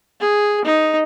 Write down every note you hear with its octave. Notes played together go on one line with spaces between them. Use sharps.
G#4
D#4